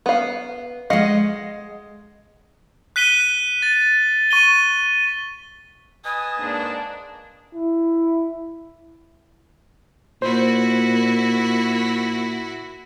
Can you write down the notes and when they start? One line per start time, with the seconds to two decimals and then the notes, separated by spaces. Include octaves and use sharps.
0.06 B3 F5
0.90 G#3 D#5 F5 F#5
2.96 F#6 B6 D#7 G7
3.62 A6
4.31 C#6 D#7 G7
6.05 B4 D#5 G#5 A5 D#6
6.38 G#2 A#3 D4
7.54 E4
10.22 A#2 E4 F#4 C5